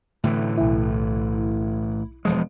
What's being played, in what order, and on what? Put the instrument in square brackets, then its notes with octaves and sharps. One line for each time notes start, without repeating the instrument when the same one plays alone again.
[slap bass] A2 D3 E3
[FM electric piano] B1 E4
[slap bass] E1 F3 G#3